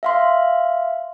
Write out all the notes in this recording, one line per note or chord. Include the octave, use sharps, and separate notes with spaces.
E5 F5 C6